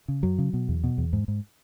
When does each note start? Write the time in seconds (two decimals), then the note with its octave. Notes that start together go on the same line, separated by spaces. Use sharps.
0.08 C#3
0.23 F#2 F#3
0.38 C#3
0.53 B2
0.69 E2
0.84 B2
0.98 E2
1.13 G#2
1.28 G#2